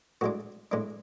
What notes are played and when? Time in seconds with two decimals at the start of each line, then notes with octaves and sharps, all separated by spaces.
0.21 A2 G#3 D4 F#4
0.71 A2 G#3 D4